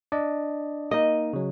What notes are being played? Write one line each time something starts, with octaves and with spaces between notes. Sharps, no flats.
D4 D5 D#5
A#3 D#4 D#5
C#3 F#3